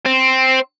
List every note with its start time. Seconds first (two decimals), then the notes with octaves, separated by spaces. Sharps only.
0.06 C4